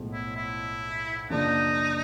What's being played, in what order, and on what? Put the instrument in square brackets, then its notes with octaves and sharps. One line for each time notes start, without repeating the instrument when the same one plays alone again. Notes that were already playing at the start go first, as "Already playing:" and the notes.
Already playing: [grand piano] B1 A2 F3 G#3 B3
[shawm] E4
E4
[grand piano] F#2 C#3 F3 A#3 D4 [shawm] D#4